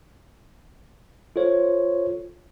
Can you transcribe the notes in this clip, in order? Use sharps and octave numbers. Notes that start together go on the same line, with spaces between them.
F4 A4 C5 C#5